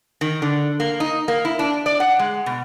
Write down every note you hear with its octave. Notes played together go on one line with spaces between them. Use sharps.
D#3
D3
A#3
D#4
A#3
E4
D4
D5
F#5
G#3
B2